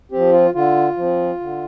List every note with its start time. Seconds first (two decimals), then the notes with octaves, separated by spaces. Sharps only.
0.11 F3 C4 G4
0.32 F4
0.54 D3 F4
0.97 F3 C4
1.40 D3